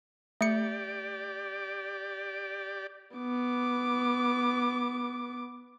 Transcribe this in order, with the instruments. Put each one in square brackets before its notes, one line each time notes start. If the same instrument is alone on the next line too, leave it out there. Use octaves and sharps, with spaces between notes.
[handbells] A3 C#7 [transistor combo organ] G4 D5
[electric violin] B3 D6